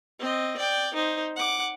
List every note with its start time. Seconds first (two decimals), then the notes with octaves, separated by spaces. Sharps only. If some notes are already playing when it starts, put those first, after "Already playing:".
0.20 C4 D#5
0.58 D5 G5
0.94 D#4 C5
1.36 F#5 D6